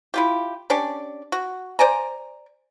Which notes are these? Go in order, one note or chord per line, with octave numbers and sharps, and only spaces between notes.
E4 F4 G4
C#4 D4 G4 D5
F#4
C5 D5 G#5 A#5